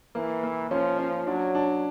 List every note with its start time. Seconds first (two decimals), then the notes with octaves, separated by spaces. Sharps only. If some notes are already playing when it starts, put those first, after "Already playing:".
0.15 E3 A#3
0.43 A#3
0.71 F3 C#4
0.99 C#4
1.27 F#3 D4
1.55 D4